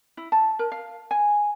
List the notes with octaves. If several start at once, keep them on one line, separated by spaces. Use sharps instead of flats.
E4
A5
A#4
F5
G#5